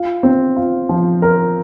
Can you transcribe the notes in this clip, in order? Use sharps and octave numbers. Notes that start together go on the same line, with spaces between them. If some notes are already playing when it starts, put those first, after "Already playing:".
Already playing: F4
C4
F4
F3
A#4